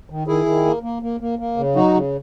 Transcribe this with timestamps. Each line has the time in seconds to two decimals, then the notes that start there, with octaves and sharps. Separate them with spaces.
0.10 D#3
0.27 D#3 E4 G#4
0.46 D#3
0.65 A#3
0.83 A#3
1.02 A#3
1.20 A#3
1.39 A#3
1.57 C#3
1.76 F#3 D#4 F#4
1.94 C#3